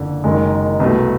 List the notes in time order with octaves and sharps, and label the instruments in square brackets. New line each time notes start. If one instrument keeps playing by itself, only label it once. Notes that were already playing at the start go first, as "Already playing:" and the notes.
Already playing: [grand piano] F#1 F2 D3
F#1 F#2 D#3 G#3
C2 B2 F#3 A3